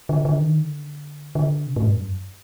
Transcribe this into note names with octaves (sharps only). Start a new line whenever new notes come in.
D3
D3
D#3
D3
D3
C3
A2
G2
F#2